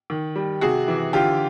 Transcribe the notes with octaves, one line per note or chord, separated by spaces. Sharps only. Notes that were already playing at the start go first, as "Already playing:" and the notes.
D#3
G3
C3 F#4 G#4
E3
D3 F4 G4